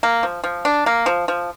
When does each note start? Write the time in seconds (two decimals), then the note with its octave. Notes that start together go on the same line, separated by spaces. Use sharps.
0.03 A#3
0.23 F3
0.44 F3
0.65 D4
0.86 A#3
1.06 F3
1.28 F3